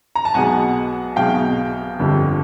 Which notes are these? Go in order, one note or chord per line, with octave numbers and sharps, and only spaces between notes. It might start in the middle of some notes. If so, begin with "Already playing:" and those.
A#5
A5
B1 B2 G#3 F#5 G#5
B1 B2 G#3 F5 G5
G1 F2 D3 G3